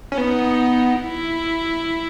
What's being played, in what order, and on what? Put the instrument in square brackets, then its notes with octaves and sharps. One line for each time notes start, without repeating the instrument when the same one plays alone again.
[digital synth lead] C#4
[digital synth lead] B3 [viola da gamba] D#4
[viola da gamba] E4